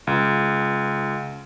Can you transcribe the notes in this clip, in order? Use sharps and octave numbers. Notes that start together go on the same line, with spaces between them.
C#2